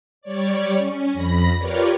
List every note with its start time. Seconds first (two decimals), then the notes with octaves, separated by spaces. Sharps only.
0.22 G3 C#5 D5
0.77 C#4
1.12 F2 B5 A#6
1.58 F4 G4 A#4 B4 C#5 D5